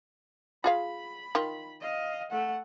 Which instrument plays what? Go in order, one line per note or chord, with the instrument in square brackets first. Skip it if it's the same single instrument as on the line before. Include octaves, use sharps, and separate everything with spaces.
[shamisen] F4 G#4 F5 [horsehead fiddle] B5
[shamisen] D#3 F4
[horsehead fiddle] D#5 F5
A3 F#5